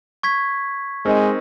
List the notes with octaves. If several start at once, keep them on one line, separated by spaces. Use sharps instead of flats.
C#6 G#6 B6
G#3 C4 D#4 A#4